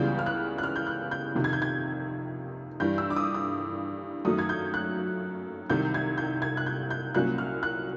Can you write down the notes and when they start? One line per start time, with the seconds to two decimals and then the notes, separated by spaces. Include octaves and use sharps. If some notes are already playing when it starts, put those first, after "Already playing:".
Already playing: C#2 C#3 E3 G3 B3 G6
0.19 F6
0.26 F#6
0.58 F#6
0.63 F6
0.76 G6
0.87 F#6
1.11 G6
1.35 F2 C3 D#3
1.44 G#6
1.53 G6
1.62 G#6
2.80 G2 E3 G3 G6
2.98 E6
3.10 D6
3.16 D#6
3.34 D#6
4.25 F#2 D#3 F#3 A3 D#6
4.39 G#6
4.49 G6
4.74 F#6
5.70 C2 C3 D#3 G6
5.94 G#6
6.18 G6
6.42 G#6
6.57 F#6
6.66 G6
6.90 G6
7.15 C2 A#2 F#3 A#3 C#4 F#6
7.38 F6
7.63 F#6